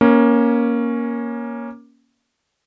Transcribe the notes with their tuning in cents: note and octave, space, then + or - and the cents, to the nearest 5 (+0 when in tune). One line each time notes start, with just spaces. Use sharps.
A#3 +15 C#4 +0